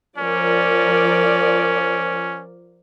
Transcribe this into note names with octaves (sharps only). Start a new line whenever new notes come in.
F3 C#4 A#4 D5